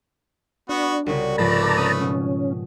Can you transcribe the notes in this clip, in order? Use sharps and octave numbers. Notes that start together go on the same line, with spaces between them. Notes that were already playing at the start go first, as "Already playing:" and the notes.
B3 D4 F#4
C2 C#3 F#4
G#2 F3 A3 B4 D5 A5 A#5
C#4 D#6
B2 C#4